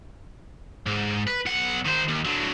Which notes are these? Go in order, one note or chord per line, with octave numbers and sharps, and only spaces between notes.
G#2
B4
B1 F#5
D#3 C5
D#2
D3 F#3